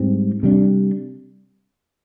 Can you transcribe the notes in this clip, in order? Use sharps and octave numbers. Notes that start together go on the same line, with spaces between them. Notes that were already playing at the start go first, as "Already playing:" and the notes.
Already playing: G#2 G3 C4
C3 G3 D4